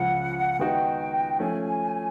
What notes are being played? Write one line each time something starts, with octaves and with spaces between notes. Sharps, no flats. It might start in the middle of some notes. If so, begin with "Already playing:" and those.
Already playing: C#2 C#3 F3 F#5
D#3 G#3 B3 D#4 F#4 G5
F3 A3 C#4 G#5